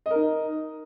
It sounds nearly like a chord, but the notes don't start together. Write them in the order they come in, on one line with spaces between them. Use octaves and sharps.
D#5 A#4 D#4